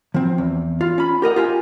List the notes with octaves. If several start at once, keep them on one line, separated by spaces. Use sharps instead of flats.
F3 C4
E2
F4
C#4 B5
G4 A#4 D#5 F#5
F4 G4 G#5